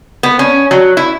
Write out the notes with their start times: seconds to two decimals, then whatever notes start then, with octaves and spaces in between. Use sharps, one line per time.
0.23 B3
0.39 C#4
0.71 F#3
0.97 E4